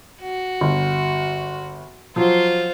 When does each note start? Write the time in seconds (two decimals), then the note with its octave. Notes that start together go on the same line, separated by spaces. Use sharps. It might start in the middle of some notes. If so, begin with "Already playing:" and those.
0.22 F#4
0.61 G1
2.16 F3 F#3 F4 C5